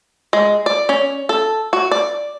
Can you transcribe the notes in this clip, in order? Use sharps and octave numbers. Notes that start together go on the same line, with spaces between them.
G#3
D5
C#4
A4
F#4
D5